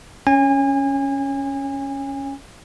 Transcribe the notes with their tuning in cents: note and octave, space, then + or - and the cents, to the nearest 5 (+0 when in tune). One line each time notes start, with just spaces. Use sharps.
C#4 +0 G#5 -30